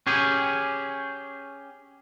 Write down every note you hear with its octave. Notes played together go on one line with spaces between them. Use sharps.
C#4 G4 G#4